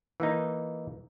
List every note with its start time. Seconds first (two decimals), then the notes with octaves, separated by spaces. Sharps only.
0.20 E3 A#3 D#4